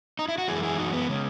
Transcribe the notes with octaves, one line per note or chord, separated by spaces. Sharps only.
D#4
E4
F#4
F#2 E3 G#3 E4 G#4
E4 G#4
D#4 F#4
B3
C#3 G#3